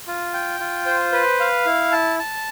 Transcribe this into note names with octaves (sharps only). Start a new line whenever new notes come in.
F4
G5
F4
C5
B4
F5
E4
A5
A5